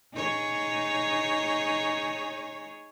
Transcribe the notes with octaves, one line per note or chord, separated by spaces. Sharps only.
D#4 G#4 C#5